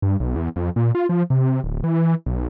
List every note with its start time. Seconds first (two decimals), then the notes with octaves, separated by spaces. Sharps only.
0.02 G2
0.20 B1
0.36 E2
0.56 F2
0.76 A#2
0.95 F4
1.09 F3
1.30 C3
1.64 D1
1.84 E3
2.26 B1